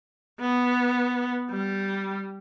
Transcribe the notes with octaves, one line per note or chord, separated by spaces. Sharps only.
B3
G3